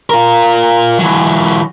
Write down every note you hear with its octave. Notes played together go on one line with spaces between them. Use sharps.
F4 A#4
E3 F#3